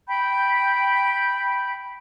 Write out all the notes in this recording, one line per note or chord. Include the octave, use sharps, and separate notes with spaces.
G5 B5 G6